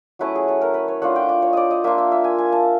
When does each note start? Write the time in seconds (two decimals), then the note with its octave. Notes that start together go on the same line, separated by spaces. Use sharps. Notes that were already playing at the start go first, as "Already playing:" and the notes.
0.19 F#3 A3 C#4 E4 B4
0.36 G#4
0.48 A4
0.61 A#4
0.74 B4
0.88 C#5
1.02 A3 D4 F4 F#5
1.16 G5
1.29 D5
1.42 C#5
1.53 D5 D#5
1.71 D#5
1.84 A#3 D4 F4 E5
1.98 E5
2.12 E5
2.24 G#5
2.38 G#5
2.52 A5